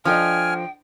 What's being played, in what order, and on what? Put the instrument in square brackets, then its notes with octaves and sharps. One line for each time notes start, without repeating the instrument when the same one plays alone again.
[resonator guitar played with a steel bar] F3 [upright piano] D4 A4 D#5 [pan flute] G5 [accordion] G#5 F6